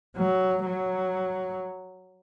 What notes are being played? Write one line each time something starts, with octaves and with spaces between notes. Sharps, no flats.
F#3
F#3